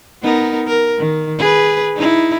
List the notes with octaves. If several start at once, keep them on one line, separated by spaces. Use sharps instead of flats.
B3 D#4 A#4
A#4
D#3
G#4 B4
D#4 E4